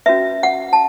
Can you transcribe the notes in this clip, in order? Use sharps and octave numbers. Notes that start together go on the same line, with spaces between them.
C#4 F#4 B4 E5
F#5
A5